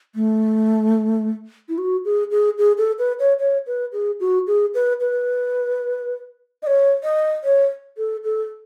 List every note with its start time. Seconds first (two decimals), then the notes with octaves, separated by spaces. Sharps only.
0.15 A3
1.69 E4
1.78 F#4
2.05 G#4
2.31 G#4
2.58 G#4
2.78 A4
2.99 B4
3.19 C#5
3.39 C#5
3.67 B4
3.93 G#4
4.20 F#4
4.47 G#4
4.75 B4
5.00 B4
6.63 D#5
6.67 C#5
7.04 D#5
7.44 C#5
7.98 A4
8.24 A4